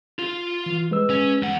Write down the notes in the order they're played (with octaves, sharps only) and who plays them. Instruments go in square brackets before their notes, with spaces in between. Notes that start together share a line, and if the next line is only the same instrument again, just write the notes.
[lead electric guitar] F4
[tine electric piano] E3
G#3 B4 E6
[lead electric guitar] C#4
E2 F#5